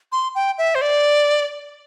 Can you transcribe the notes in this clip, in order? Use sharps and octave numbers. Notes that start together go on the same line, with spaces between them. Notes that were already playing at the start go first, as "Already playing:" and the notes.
C6
G5
E5
C5
D5